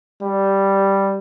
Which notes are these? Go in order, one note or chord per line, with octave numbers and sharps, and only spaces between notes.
G3